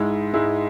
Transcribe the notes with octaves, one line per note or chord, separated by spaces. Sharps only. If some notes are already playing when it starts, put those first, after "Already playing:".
Already playing: G#2 G#3 E4
G#2 G#3 E4